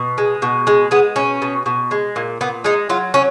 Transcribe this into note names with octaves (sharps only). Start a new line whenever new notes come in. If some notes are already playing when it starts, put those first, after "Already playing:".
Already playing: B2
G#3
B2
G#3
G#3 B3
B2 C#4
B2
B2
G#3
A#2
A#2 B3
G#3 D#4
F#3 F4
F#3 C#4